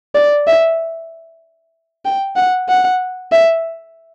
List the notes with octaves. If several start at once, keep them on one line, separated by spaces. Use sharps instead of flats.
D5
E5
G5
F#5
F#5
E5